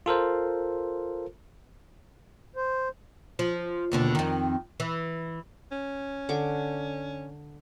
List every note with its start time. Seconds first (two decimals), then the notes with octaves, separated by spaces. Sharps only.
0.06 F4 A4 A#4 C5
2.56 C5
3.39 F3
3.92 D#2 B2 D3
4.15 F2 D#3
4.80 E3
5.72 C#4
6.29 D3 C#6 D6